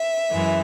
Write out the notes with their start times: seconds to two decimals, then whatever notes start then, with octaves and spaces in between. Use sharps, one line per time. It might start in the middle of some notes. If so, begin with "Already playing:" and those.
Already playing: E5
0.31 F#2 E3 G#3